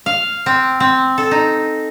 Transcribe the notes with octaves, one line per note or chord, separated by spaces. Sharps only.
F5
C4
C4
A4
D#4